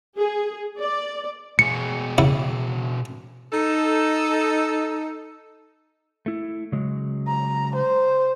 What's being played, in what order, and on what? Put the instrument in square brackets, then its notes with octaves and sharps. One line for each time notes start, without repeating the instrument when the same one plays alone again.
[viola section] G#4
D5
[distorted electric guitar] B2 G#4 [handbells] C#7
[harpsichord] C#3 E4
[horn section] D#4 A4
[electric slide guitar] A3 E4
C#3 F#3 G#3
[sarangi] A#5
C5